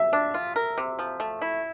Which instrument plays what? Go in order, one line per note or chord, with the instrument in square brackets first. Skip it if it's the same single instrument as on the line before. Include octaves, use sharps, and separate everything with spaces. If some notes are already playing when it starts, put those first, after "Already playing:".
Already playing: [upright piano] E5
[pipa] D4
F4
A#4
C3
F3
A3
E4